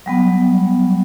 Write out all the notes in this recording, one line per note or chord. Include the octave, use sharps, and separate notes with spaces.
F#3 G3 B3